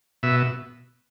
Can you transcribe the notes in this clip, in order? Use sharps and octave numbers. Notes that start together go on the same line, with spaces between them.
B2 E5